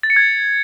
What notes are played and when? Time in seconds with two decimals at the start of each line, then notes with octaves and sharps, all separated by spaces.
0.03 A6
0.10 C#7
0.16 G#6